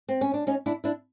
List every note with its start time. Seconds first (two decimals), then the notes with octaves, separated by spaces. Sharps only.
0.09 C4
0.21 C#4
0.34 D4
0.47 C#4 D#4
0.66 D4 E4
0.84 D4 E4